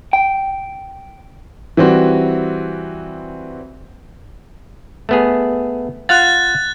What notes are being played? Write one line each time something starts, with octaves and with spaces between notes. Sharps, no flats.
G5
E3 G3 C4 F#4
A3 B3 G#4
F4 F5 F#5 F#6 A6